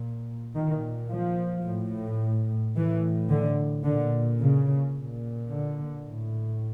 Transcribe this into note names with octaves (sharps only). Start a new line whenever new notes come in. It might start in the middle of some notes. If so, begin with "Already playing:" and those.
Already playing: A#2
A#2 D#3
F3
A2
A2 E3
D3
A#2 D3
C#3
A#2
D3
A2